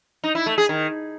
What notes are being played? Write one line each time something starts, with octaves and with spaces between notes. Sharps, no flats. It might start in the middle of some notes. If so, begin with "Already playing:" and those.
D#4
E4
A3
G#4
D#3